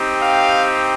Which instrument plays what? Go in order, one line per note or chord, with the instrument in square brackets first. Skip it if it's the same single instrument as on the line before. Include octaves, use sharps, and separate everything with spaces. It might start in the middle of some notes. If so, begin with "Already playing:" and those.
Already playing: [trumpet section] C4 D#4 G4
F5